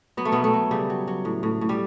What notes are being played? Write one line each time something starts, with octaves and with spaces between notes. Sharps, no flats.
F#3 B3
A3
B2 F#3 B3
A3
F#3
C#3 G3
F#3
F#3
A2
A2
A2
G3